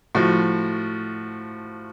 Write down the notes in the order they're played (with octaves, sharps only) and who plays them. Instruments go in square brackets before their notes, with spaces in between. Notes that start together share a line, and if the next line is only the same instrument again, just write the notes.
[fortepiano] A2 F3 F#4